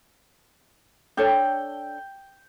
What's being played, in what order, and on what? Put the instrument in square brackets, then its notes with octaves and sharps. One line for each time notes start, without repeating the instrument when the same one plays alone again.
[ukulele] D4 A4 C#5 [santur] G5